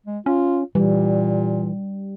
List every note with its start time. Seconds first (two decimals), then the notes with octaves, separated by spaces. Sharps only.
0.06 G#3
0.26 C#4 F4
0.75 A#2 E3 G3